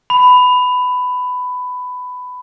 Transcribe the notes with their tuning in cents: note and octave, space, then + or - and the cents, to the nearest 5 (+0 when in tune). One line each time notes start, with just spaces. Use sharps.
B5 +15